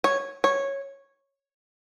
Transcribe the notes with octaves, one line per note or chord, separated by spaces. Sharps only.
C#5
C#5